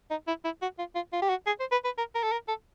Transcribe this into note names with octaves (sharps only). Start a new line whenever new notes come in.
D#4
E4
E4
F#4
F4
F4
F4
G4
F#4
G#4
C5
B4
B4
A#4
A#4
A4
A#4
A4